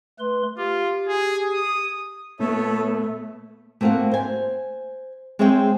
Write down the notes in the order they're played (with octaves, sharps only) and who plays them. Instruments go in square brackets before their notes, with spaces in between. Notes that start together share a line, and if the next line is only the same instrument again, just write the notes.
[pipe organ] A3 B4 C6
[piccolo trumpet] F4 [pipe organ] G4
[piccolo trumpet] G#4
D#6
[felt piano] A#2 [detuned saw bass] A3 [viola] B3 [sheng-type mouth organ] A4 C#5 E5
[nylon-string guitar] A3 A#3 C4 F#4 F5 F#5
C5 G#5
G#3 C4 G#4 C#5 E5 G5